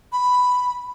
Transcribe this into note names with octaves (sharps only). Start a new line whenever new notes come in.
B5